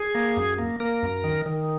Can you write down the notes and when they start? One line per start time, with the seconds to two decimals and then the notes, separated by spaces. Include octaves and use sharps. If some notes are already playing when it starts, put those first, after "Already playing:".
Already playing: G#4
0.15 A#3
0.37 F#2
0.58 A#3
0.80 A#3 A#4
1.03 F#2
1.24 D#3
1.46 D#3